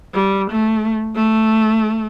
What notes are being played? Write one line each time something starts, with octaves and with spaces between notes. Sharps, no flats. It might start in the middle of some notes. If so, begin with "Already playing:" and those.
G3
A3
A3